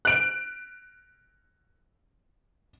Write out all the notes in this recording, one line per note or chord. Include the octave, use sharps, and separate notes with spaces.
F#6 D7